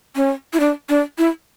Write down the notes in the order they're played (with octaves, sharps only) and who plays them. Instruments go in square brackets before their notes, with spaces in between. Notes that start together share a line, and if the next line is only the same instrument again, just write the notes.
[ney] C#4
E4
D4
D4
E4